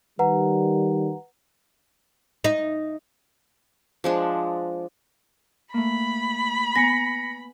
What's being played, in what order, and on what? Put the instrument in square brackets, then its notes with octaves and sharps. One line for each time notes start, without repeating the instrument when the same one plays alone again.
[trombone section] D#3 G3 [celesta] B4 F#5 A#5
[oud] D#4
[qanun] F3 G#3 D4
[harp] A3 A#3 [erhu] B5
[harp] B3 G#5 [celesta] A#6 B6 C#7